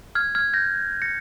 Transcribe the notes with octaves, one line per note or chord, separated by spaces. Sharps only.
F6 G#6
F6 G#6
G6 A#6
A#6 C#7